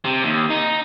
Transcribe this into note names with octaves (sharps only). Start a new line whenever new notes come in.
C3
D#2
D#4